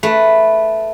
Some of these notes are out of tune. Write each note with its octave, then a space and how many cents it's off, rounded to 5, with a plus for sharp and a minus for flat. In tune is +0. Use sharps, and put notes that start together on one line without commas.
A3 +0 B4 +0 E5 +0